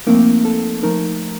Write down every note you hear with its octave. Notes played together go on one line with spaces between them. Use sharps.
F3 A3 A#3 C4 D#4 A#4
A4 A5
F3 A3 D#4 A#4 A#5